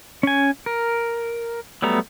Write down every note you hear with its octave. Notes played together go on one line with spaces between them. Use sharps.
C#4 G#5
A#4
F#3 G3 A3 B3 A#5